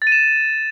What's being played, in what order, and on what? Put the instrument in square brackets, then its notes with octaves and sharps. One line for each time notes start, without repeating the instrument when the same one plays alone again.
[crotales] A6
D#7
E7